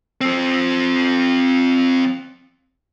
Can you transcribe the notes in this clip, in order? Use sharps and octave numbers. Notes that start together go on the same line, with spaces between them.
F3 C4